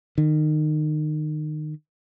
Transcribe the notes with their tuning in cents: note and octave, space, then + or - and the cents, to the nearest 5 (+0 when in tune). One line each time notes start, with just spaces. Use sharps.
D#3 -25